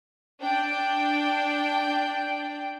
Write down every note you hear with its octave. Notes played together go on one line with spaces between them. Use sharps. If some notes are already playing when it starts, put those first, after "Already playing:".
D4 G5